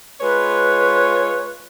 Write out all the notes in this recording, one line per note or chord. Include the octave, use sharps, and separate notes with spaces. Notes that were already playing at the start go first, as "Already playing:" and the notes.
G#3 F4 B4 C#5